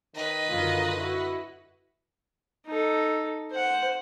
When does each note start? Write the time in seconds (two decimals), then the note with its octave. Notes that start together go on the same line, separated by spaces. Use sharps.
0.15 D#3 B4 D#5
0.49 F#2 D3 D#3 F4
0.97 E4 F#4
2.66 D#4 A4
3.51 C5 F#5